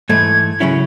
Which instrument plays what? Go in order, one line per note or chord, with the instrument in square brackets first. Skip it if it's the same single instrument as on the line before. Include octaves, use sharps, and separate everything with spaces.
[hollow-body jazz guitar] G#2 E3 A3 [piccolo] G#6
[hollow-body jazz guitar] C#3 F#3 C#4 E4